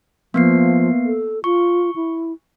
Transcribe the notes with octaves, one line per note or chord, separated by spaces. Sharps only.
F3 A#3 B3 C7
A4
F4 C#6
E4